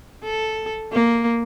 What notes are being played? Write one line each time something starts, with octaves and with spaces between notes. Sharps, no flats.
A4
A#3